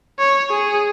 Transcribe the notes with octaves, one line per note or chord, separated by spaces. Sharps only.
C#5
G#4